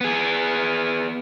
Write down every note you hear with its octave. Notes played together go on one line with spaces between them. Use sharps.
B3 G#4